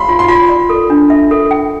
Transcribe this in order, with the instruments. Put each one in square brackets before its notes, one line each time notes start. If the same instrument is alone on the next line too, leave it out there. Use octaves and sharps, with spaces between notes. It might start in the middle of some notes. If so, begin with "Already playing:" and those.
Already playing: [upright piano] B5 C6
[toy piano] F4
[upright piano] C6
[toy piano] F4 [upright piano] B5
[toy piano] D5
A4
D4
E5
A4
G5